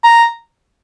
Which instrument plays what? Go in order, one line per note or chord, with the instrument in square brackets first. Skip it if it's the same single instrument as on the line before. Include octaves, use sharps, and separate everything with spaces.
[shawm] A#5